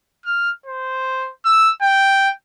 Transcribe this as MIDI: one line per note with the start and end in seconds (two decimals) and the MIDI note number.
0.25 0.50 89
0.66 1.30 72
1.45 1.71 88
1.82 2.30 79